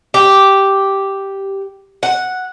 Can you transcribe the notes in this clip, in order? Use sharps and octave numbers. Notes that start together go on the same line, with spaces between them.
G4
F#5